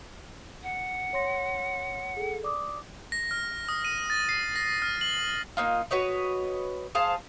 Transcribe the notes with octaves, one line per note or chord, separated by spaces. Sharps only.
F#5
C#5 C6 A#6
G#4 A4
D5 D6 D#6
A#6
F6
D#6
D#7
A6
C7
A#6
F6
F#7
A#3 D#4 F4
F#4 B4 C#5 D#5
G#4 C5 F5 A5